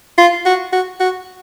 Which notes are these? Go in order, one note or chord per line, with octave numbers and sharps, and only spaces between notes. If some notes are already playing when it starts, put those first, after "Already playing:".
F4
F#4
F#4
F#4